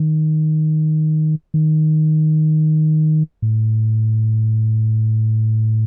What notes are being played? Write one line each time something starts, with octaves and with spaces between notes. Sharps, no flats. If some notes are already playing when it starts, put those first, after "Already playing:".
Already playing: D#3
D#3
A2